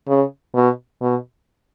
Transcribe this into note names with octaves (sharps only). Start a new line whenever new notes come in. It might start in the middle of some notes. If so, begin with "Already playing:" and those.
C#3
B2
B2